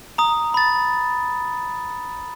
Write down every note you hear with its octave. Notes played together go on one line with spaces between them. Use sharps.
A#5 D#6
B5 A6